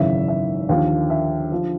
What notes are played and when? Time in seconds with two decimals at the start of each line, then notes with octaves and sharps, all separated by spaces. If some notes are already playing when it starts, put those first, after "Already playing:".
Already playing: G#1 F#2 C#3 E3 E5
0.28 E5
0.69 D#2 D3 F3 F5
1.10 E5
1.52 D3 F3